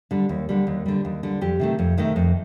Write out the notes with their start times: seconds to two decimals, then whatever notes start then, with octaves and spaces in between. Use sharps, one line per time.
0.11 D3 G3
0.29 D#2
0.49 D3 G3
0.67 D#2
0.86 D3 G3
1.05 D#2
1.23 D3 G3
1.41 F2 G4
1.60 C3 D#3 A3
1.79 F2
1.98 C3 D#3 A3
2.16 F2